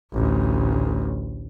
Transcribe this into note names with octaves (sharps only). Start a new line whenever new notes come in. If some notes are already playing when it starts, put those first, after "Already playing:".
A1 D2